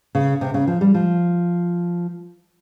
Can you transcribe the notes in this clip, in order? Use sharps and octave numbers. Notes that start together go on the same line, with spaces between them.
C#3
C3
C#3
F3
G3
F3